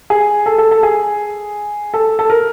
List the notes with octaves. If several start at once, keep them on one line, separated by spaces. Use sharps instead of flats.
G#4
A4
A4
A4
G#4
A4
A4
A#4